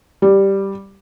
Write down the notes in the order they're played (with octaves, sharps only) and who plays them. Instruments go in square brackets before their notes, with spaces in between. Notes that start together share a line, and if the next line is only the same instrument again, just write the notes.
[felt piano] G3